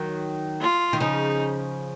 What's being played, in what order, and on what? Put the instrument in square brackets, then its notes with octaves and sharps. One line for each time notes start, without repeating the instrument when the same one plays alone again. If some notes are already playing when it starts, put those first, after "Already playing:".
Already playing: [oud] D#3 F#3
[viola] F4
[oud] D#3
[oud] C#3 F3 [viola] D#4